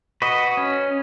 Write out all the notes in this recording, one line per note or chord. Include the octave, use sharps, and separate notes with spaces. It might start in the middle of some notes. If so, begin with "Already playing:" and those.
F#4 B4 D#5
C#4